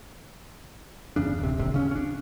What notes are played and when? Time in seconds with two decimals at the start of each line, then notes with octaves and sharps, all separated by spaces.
1.16 G1 E2 C#3 D4
1.39 D1 C3
1.58 D#1 G#1 C3
1.74 C#3 C#4
1.91 C#4 D4